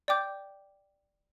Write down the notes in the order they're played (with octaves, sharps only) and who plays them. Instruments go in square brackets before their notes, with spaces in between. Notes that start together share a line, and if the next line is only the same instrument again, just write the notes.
[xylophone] D5 G5 D6 G6